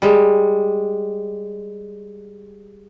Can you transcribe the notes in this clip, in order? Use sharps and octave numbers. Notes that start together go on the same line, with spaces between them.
G3 G#3